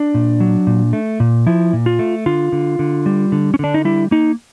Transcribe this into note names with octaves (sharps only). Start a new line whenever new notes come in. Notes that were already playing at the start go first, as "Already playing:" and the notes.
Already playing: D4
A#2
F#3
A#2
A3
A#2
F3 E4
A#2
F4
A3
D3 F4
D3
D3
G3
D3
C#4
D3 D4
D#4
G3 E4
A#3 D#4